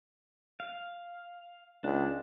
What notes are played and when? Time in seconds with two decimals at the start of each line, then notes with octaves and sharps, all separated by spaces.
0.60 F5
1.84 C#2 D4